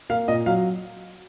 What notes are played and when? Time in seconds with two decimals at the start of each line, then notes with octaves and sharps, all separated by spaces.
0.09 A#3 F5
0.28 A#2 D#5
0.46 F#3 F5